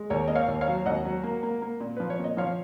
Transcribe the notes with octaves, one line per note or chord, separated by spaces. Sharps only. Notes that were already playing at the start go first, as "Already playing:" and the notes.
Already playing: G#3
D#2 A#4 C#5
A#3 D#5
C#5 F5
D#2
C#5 F5
F#3
D#2 D#5 F#5
F#3
A#3
A#3
A#3
A#2
F3 B4
C#5
A#2 D#5
F3 C#5 F5